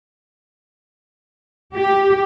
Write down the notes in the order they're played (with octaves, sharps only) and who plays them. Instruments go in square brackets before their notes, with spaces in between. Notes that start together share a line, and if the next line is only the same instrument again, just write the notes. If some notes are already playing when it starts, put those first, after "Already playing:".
[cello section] G4